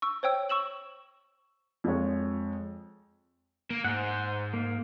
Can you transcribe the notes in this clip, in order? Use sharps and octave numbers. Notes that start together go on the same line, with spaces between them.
C#6 E6
C5 C#5 G5 E6
C#6 E6 E7 F#7
F2 G#3 C#5
A#3
G#2 C5 F#5
A#3